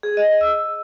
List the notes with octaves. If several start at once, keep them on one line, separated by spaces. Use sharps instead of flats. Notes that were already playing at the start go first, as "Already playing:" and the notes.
G#4
D#5
E6